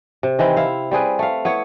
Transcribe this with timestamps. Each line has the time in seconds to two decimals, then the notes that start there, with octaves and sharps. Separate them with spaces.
0.23 C3
0.39 D#3 E3 C4 E4
0.57 E4 F5
0.91 G3 C4 G#4 B4
1.19 A3 F5
1.45 B3 E4 C#5